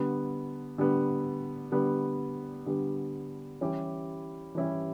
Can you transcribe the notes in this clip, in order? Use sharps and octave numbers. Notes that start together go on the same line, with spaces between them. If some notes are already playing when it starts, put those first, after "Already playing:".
Already playing: D3 G3 B3
D3 G3 B3
D3 G3 B3
D3 G3 B3
E3 G3 C#4 E4 G4
E3 G3 C#4 E4 G4